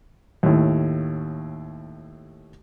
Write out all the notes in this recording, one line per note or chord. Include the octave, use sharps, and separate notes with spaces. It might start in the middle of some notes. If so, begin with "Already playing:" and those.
D#2 A2